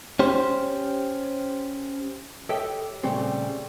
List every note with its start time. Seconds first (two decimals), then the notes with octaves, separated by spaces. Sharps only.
0.19 C#4 G4 C5
2.49 G4 A4 C#5 D#5 E5 G5
3.03 A#2 C#3 G3 A3 C4